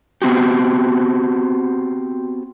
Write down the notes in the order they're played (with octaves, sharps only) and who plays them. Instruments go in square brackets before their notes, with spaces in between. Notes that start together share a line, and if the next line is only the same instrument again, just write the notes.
[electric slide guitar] B3 C4 F#4 G4